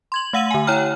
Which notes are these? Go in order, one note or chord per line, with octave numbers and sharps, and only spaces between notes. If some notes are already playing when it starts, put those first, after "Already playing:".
C6 G#6 F#7
A3 F5 F#5 E6 D#7 F#7
D3 G#5
E4 C#5 G5 A#5 F6